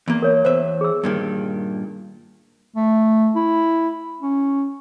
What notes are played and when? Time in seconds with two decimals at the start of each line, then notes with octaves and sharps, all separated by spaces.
0.08 E2 A#3
0.22 A#4 C#5
0.45 E2 C5 E5
0.81 G#4 E6
1.03 G2 A#2 D#3
2.76 A3
3.35 E4
4.21 C#4